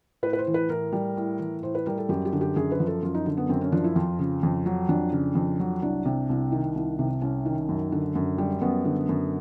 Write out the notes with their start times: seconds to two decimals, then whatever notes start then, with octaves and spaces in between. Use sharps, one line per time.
0.23 A2 B4
0.33 B4
0.39 C5
0.47 E3
0.54 B4
0.69 A2 A#4
0.93 G3
1.17 A2
1.39 E3
1.63 A2 C5
1.75 B4
1.86 G3 A#4
1.98 A4
2.09 F#2 G4
2.25 G4
2.33 D3
2.41 G4
2.56 F#2 G#4
2.72 B4
2.80 F3
2.87 A4
3.03 F#2 F4
3.15 D#4
3.26 D3
3.37 B3
3.49 F#2 C4
3.61 C#4
3.72 F3 D4
3.84 E4
3.96 F2 F4
4.19 C#3
4.43 F2
4.66 F#3
4.89 F2 D4
5.13 C#3
5.35 F2
5.60 F#3
5.82 C2 D4
6.05 C3
6.29 C2
6.52 D#3
6.75 C2
6.99 C3
7.21 C2 C#4
7.46 D#3
7.69 F#2
7.92 D3
8.16 F#2
8.38 G3
8.62 F#2 B3
8.85 D3
9.09 F#2